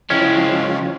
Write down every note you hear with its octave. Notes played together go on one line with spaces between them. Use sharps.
C#3 F3 G#3 C4 C#4 E4